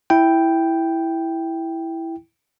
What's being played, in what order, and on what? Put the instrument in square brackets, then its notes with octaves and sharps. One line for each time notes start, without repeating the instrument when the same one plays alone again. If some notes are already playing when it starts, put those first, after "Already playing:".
[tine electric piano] E4 G5